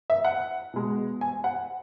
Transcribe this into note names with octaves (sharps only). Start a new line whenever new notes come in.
E5
F#5
B2 G#3
G#5
F#5